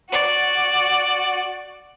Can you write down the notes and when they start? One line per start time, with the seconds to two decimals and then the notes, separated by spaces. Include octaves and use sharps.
0.10 F#4 D5